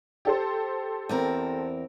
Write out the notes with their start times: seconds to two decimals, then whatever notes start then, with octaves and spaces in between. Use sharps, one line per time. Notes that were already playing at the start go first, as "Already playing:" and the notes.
0.25 G4 A4 C5
1.09 E2 C4 A#4